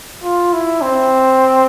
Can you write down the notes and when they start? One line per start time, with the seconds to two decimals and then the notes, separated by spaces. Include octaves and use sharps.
0.24 F4
0.53 E4
0.81 C4